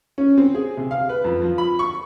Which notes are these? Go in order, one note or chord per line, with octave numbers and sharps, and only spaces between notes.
C#4
C4
G#4
C3
F5
B4
F2
F3
B5
C#6